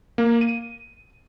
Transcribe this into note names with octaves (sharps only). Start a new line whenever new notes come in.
A#3
D#7